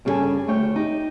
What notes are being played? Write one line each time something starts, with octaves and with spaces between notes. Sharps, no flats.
G2 C#3 E4 G4 A4 G#5
D2 A3 C#5 G5
D#4 G4